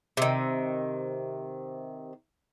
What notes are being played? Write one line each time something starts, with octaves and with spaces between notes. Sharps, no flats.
C3 D#3